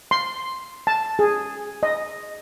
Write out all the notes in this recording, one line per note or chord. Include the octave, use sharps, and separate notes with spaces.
C6
A5
G#4
D#5